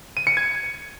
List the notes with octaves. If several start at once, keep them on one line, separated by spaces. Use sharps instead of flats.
D#7
C#7
G#6